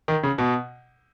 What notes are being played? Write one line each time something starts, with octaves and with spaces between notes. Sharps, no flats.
D#3
C#3
B2